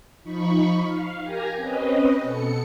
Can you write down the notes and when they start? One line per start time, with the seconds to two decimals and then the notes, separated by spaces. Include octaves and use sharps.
0.23 F3 D#4 B5 C#6
0.82 F5
1.22 G4 A#4 G#5 A#5
1.55 C4 C#4 B4 D#5
2.22 B2 A4 C#7